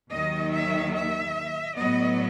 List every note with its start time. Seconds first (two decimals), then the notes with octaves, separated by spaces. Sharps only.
0.11 D#2 D#3 F#3 D#5
0.52 E5
0.94 E5
1.76 A2 F#3 B3 D#5